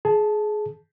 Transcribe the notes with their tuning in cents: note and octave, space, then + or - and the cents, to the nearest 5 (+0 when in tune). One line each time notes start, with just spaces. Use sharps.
G#4 +25 A5 -5